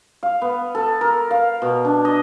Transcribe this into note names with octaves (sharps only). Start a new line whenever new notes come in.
F5
B3
A4
A#4
F5
B2
D4
D#5